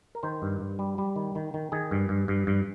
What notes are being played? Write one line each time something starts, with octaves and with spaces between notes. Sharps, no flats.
A#4
D#3 C5
G2
G2
G3
G3
D#3
D#3
D#3
D#3 G#4
G2
G2
G2
G2